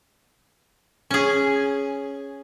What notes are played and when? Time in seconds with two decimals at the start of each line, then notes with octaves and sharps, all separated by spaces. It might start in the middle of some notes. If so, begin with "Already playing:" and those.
1.11 C#4 G#4